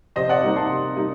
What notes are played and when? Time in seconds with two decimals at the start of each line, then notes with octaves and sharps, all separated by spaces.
0.16 C3 C5 D#5
0.29 D5 F#5
0.43 G3 A#3 D#4
0.56 A5 C6
0.70 C3
0.96 G3 A#3 D#4